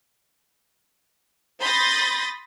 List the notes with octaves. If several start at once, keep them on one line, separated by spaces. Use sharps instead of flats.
B5 C6 D#6 G6 A6 A#6